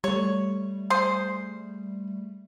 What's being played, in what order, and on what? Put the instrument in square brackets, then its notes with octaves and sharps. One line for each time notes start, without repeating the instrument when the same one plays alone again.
[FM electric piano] G3 A3 [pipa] C#5
[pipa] G#4 C5